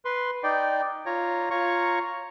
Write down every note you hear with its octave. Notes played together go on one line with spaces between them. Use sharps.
B4 C6
D#4 D5 G5
F4 C#5 A#5
F4 C#5 A#5 C#6